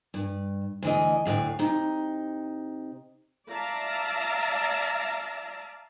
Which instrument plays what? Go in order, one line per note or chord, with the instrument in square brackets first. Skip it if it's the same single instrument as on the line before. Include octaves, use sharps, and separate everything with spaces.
[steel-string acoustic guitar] G2
D2 E3 D#5
D2 A2 F5
C3 D#4
[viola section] D5 E5 F5 A5 A#5